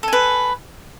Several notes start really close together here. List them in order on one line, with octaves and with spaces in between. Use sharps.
A4 G#5 B4